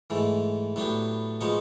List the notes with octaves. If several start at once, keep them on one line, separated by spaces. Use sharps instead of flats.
G#2 E3 A3
A2 F#3 B3 D4 G4
F3 G#3 B3 D#4 F#4